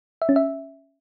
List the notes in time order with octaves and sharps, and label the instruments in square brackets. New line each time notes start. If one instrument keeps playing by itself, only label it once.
[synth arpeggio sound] E5
C#4
E5